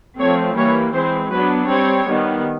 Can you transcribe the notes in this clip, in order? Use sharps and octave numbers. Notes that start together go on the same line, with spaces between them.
F3 A3 C4 C#5
E3 G3 A#3 C#5
E3 G#3 C4 C5
F#3 B3 D4 B4
G3 C4 C#5
D#3 G3 B3